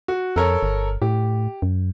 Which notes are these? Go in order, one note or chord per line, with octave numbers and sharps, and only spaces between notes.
F#4
F2 A4 A#4 C#5
G1
A2 G4
F#2